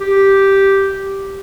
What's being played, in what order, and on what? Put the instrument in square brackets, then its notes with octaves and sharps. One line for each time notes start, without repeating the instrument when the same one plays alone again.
[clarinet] G4